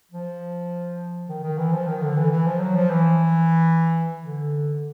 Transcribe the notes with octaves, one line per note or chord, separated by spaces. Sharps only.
F3
D#3
D#3
E3
F3
D#3
D3
E3
E3
F3
F#3
F3
E3
D3